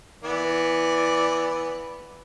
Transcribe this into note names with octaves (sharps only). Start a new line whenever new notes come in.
E3 B3 D5